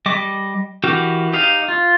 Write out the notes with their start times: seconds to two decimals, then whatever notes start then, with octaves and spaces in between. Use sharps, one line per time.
0.06 G3 D#5 D6
0.84 E3 F#4 G4 A#4
1.33 D#4 G4 D#5 F5
1.68 F4